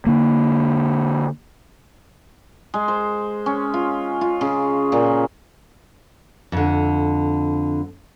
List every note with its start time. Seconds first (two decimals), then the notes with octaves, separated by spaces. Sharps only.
0.06 D3 A#3
2.74 G#3
2.88 C5
3.46 C#4
3.74 F4
4.21 F4
4.41 C#3
4.92 A#2
6.52 F2 D3